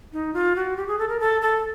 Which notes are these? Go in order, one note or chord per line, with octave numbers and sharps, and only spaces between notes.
D#4
F4
F#4
G4
G#4
A4
A#4
A4
A4